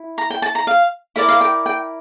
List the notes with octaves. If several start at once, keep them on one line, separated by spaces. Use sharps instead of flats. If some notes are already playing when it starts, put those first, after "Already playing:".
Already playing: E4
A#5
G5
A5
A#5
F5
E4 A#4 D5 E5
F5
G5
G5